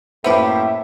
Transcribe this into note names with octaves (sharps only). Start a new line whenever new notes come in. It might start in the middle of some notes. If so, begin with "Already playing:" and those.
F#2 A2 A#3 B3 E4 G4 C5 E5